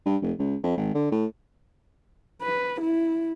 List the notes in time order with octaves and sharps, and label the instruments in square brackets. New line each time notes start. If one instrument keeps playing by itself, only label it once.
[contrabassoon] G2
F1
C#2
F2
G#1
D3
A2
[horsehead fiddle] B4
E4